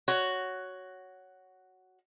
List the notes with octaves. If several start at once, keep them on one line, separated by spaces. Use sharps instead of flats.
F#4 C#5